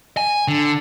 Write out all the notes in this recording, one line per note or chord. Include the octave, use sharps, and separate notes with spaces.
G#5
D3